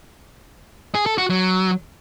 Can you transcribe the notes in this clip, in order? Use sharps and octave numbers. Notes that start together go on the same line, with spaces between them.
G#4
A4
F#4
F#3